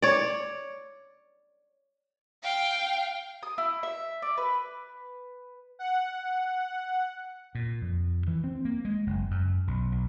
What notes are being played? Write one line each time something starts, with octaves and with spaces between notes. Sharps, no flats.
C#5 D5
F5 G5
D#6
E4
E5
D5
B4
F#5
A#2
F2
E3
C4
A#3
G#3
F#1
F#2
B1
B1